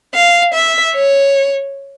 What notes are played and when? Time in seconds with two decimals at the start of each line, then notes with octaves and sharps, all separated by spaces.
0.15 F5
0.54 E5
0.95 C#5